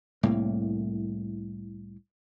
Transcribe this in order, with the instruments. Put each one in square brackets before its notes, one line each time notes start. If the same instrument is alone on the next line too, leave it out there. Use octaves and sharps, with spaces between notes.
[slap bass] C2 A2 A#3